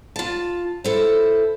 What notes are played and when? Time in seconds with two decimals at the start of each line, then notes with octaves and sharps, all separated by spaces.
0.16 F4 A5
0.84 E4 A4 C5